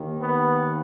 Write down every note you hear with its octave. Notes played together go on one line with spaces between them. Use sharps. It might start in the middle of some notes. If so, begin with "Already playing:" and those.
Already playing: D#2 D#3
B3